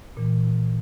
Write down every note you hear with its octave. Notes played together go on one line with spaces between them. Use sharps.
A#2 E3